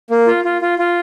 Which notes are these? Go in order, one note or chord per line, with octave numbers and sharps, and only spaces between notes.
A#3
F4
F4
F4
F4